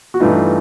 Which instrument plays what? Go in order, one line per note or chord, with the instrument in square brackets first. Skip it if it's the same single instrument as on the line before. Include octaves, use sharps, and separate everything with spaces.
[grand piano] F#4
G2 E3 A3 D#4 F4